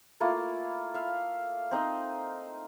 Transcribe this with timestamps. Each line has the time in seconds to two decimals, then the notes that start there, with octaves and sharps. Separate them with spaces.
0.20 A3 A#3 E4 F4
0.94 E5 F5
1.71 C4 D#4 C5 D#5